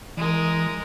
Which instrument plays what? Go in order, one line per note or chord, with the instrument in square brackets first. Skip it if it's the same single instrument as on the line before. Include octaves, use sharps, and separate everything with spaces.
[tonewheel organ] E3 [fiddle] G#3 A#4